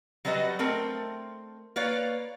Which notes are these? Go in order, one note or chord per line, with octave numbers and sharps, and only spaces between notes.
F#3 G3 F#4 B4 D#5
A3 C4 A#4
A#3 B4 C#5 D5 F5